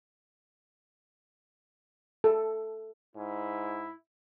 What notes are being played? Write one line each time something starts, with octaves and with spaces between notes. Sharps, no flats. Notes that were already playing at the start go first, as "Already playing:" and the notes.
A4
G#2 E4